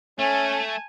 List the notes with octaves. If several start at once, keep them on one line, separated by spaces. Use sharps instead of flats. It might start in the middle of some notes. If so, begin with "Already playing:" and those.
A3 C#4 G#5 A5